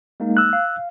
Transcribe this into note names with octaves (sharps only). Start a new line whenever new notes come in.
G#3 A#3 D#4
E6 F#6
F5